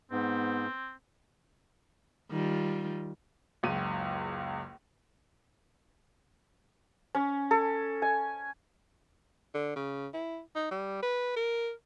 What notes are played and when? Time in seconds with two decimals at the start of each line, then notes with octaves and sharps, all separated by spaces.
0.11 G#2 B3 C4
2.30 D#3 G3 F4
3.63 F#1 C#2 D#7
7.15 C#4
7.51 A4
8.02 G#5
9.54 D3
9.76 C#3
10.14 E4
10.56 D#4
10.71 G3
11.03 B4
11.37 A#4